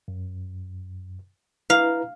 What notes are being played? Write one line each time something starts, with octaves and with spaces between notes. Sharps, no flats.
F#2
E4 B4 F5 A#5